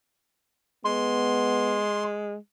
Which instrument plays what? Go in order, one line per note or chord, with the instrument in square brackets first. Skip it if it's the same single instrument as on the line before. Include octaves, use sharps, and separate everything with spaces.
[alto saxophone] G#3 [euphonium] B3 [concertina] C6